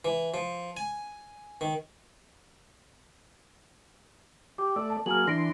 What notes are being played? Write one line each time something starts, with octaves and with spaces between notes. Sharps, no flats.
E3
F3
G#5
D#3
G4 D6
A3 D5 E6
A5
F#3 A#3 G#4 F6 F#7
E3 D4 C6 A#6 D7